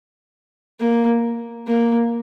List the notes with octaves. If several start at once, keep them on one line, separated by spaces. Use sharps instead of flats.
A#3
A#3